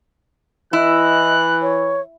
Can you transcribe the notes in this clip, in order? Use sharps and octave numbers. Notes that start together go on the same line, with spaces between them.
E3 E4 D#5 F#6
C#5